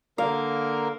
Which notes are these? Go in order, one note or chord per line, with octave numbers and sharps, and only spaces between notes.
D3 A#3 A#4 F5